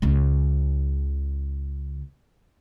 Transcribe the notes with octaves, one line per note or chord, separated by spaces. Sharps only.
C#2 C#3